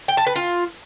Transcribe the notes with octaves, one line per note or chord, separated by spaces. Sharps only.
G5
A5
B4
F4